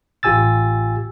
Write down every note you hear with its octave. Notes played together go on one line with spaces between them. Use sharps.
A1 F4 G4 G#5 E6 A6